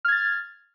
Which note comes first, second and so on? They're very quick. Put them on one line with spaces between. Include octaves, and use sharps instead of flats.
F6 G#6 A6